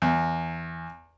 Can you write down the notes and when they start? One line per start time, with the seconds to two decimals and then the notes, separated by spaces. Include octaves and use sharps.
0.02 E2